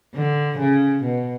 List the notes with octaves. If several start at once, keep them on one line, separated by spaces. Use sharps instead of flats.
D3
C#3
B2